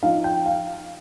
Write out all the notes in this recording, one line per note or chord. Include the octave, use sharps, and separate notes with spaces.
F3 D#4 F5
G5
F5